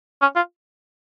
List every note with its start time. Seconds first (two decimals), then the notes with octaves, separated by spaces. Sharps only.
0.22 C#4
0.36 F4